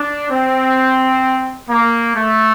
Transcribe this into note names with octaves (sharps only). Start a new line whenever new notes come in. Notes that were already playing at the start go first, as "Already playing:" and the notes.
Already playing: D4
C4
A#3
A3